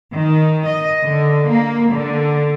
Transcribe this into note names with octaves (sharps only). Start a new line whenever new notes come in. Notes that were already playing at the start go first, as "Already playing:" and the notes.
D#3
D#5
D3
A#3
D3